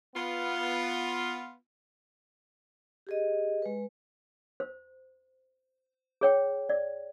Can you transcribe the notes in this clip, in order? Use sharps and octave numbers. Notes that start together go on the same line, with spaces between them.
B3 F4
G4 G#4 D#5
G#3 B4
C5
G#4 C#5 G5
D5